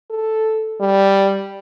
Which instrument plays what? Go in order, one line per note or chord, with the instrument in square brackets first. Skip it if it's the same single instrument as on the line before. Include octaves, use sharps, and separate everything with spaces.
[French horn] A4
G3